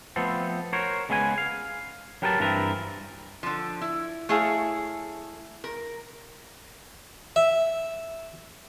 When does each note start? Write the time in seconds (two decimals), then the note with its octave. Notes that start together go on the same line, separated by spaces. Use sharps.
0.16 F3 A3 B3 C4 A4 C5
0.73 F#4 A#4 C5 C#5
1.09 C#3 G#3 B3 B4 E5 G#5
1.38 F5
2.22 F#3 G4 A#4 B4 G5 A5
2.39 G2 E3 C4 A#4 B4
3.43 D3 F3
3.81 E4
4.29 A3 E4 G#4 C#5 F5
5.64 A#4
7.36 E5